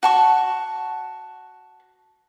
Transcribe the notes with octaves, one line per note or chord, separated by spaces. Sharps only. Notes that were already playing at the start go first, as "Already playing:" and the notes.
F#4 A5 C#6